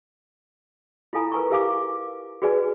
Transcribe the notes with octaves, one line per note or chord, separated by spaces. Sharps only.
E4 F4 A4 G#5 A#5
A#4 B4 G#5 A#5 C#6
G4 A#4 E5 F5 G#5 D6
F#4 G#4 B4 D5 G#5